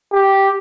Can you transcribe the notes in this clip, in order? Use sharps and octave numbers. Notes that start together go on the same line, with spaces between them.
G4